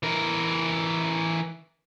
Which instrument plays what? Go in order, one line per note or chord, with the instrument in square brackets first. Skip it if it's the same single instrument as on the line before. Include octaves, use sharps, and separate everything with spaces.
[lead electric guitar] E3 A#4